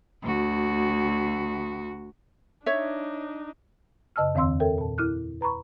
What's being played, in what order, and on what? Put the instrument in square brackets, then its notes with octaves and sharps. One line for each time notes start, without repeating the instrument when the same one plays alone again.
[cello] D2 F#4
[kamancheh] D4 D#4 [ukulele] C#5 E5
[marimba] F#2 C#3 D#5 A5 E6 F6
E2 D#3 C4 F5 C6 E6
A4 A#4 C#5 E5 G5
A#2 A5
E4 A#4 F6 F#6
B4 A#5 B5 C#6